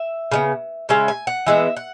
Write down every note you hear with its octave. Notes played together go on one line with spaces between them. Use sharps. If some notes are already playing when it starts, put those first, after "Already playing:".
Already playing: E5
C#3 G#3 B3
C#3 G#3 C#4 E5
G#5
F#5
E3 G#3 B3 E5
F#5